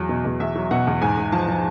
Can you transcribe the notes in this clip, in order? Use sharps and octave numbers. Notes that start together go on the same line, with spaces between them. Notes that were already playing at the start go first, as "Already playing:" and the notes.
Already playing: E2 F#3
B2
E2
E2 E5
F#3
B2 F#5
E2
G#2 G#5
G#2
F3 A5
F3